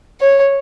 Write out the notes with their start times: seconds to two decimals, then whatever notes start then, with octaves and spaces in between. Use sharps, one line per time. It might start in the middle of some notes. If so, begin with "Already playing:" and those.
0.21 C#5